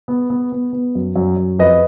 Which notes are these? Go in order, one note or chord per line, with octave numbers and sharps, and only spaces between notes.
B3
B3
B3
B3
F#2
F#2
F#2
F2 B4 D#5